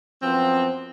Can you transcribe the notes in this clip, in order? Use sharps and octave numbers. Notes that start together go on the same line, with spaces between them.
F#2 F3 B3 C4